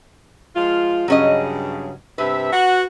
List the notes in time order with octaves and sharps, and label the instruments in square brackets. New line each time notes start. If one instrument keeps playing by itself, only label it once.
[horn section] F3 G#3 F4
[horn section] G2 C#3 [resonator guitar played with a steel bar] F#3 C#4 D#5
[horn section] G2 C3 E5 [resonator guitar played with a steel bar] B4
[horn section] F#4